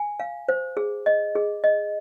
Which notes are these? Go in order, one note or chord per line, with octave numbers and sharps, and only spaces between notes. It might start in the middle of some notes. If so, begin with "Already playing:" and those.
Already playing: G#5
F5
C5
G#4
D#5
G#4
D#5